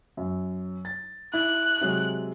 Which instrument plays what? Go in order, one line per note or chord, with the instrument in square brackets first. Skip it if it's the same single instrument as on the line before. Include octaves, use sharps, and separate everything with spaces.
[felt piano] F#2
A6
[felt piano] E4 [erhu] F#6
[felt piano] C3 F#3 G#3